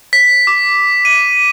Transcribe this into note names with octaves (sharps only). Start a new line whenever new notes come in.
B6
D6
D#7